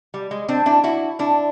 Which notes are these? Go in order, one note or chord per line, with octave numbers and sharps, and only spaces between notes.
G3
G#3
C4 D4
D4 E4
E4 F#4
D4 E4